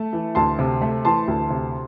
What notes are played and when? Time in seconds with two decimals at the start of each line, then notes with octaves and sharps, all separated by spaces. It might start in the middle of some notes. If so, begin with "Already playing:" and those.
Already playing: A3 A5
0.13 E3
0.35 D2 A5 C6
0.59 C3
0.82 A3
1.05 E3 A5 C6
1.28 D2
1.50 C3